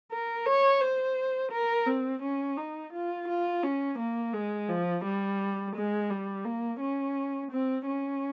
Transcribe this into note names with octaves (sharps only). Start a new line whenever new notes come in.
A#4
C#5
C5
A#4
C4
C#4
D#4
F4
F4
C#4
A#3
G#3
F3
G3
G#3
G3
A#3
C#4
C4
C#4